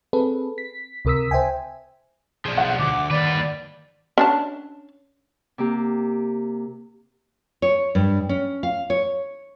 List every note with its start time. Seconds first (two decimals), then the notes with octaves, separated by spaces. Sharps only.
0.13 C4 G#4 A4 B4
0.58 B6
1.05 C#2 C3 A#4 D#6 E6 B6
1.31 C5 E5 G5 G#5
2.46 B1 F3 G#4 D5
2.57 F#5
2.79 D2 D6
3.11 D#2 G3 B4 D5
4.18 C#4 D4 A5
5.58 C3 A#3 G4
7.62 C#5
7.95 G2
8.29 C#4
8.63 F5
8.90 C#5